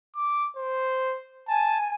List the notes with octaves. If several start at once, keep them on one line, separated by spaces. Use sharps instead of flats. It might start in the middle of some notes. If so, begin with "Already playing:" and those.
D6
C5
G#5 A5